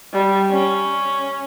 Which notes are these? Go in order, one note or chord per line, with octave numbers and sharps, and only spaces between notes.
G3
C#4